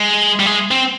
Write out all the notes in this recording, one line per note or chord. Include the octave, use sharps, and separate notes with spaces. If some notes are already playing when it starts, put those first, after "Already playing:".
Already playing: G#3
G3
G#3
C4